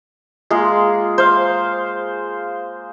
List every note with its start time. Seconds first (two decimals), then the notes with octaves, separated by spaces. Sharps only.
0.50 G#3 A#3 F4 G#4
1.18 C5 F5